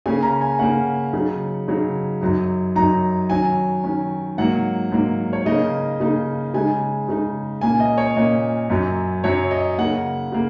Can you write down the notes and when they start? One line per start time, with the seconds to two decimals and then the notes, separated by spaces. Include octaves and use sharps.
0.06 C#3 A#3 C#4 G#5
0.22 A#5
0.41 G#5
0.59 C#3 A#3 C#4 F#5
1.13 C#3 F#3 D#4
1.68 C#3 F#3 D#4
2.21 F#2 F#3 D#4
2.75 F#2 F#3 D#4 A#5
3.29 D#3 F#3 C#4 G#5
3.84 D#3 F#3 C#4
4.38 G#2 F#3 A#3 F#5
4.92 G#2 F#3 A#3
5.33 C#5
5.45 C#3 A#3 D#4 D#5
6.00 C#3 A#3 D#4
6.54 C#3 G#3 D#4 G#5
7.08 C#3 G#3 D#4
7.61 A#2 A#3 C#4 G#5
7.80 D#5
7.98 C#5
8.16 A#2 A#3 C#4 D#5
8.70 F#2 F#3 C#4
9.24 F#2 F#3 C#4 C#5
9.51 D#5
9.78 C#3 A#3 D#4 F#5
10.32 C#3 A#3